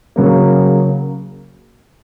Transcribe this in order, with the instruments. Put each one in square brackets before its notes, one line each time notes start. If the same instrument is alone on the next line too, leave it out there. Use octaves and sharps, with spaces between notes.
[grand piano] C#3 F#3 A#3